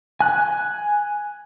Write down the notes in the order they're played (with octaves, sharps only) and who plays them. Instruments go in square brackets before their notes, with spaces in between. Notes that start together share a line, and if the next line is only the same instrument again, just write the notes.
[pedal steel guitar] G#5 F#6